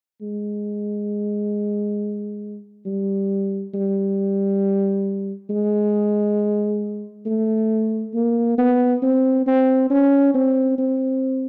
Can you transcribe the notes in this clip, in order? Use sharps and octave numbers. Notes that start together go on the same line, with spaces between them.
G#3
G3
G3
G#3
A3
A#3
B3
C4
C4
C#4
C4
C4